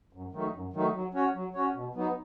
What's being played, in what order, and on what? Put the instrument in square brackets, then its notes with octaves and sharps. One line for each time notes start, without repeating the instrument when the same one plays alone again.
[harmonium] F#2
D#3 F#3 A3 D#4
F#2
D#3 F#3 A3 D#4
F#3
C#4 F#4 C#5
F#3
C#4 F#4 C#5
B2
F#3 B3 D#4